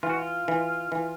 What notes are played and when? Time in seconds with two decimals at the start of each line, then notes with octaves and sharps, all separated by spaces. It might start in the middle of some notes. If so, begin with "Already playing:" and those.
0.03 E3 F4
0.10 F#4
0.17 F4
0.48 E3
0.92 E3